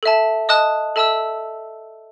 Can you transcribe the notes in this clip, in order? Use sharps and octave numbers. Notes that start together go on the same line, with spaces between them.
A4 E5 A5
D#5 A5 D#6 F#6
A4 E5 A5 E6